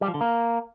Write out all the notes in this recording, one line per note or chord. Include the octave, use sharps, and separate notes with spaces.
G3
F3
D3
A#3